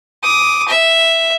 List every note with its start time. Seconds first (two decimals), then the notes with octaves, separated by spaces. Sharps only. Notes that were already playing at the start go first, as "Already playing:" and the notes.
0.23 D6 D#6
0.68 E5